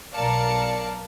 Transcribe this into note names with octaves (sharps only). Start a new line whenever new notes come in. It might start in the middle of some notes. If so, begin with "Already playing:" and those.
B1 A#4 D5 F5 A5 C#7